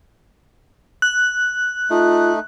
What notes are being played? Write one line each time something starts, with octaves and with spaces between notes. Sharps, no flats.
F#6
A3 D#4 F4